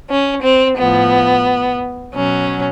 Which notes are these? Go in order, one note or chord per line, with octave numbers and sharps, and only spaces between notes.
C#4
C4
A2 F3 B3
B2 F#3 C#4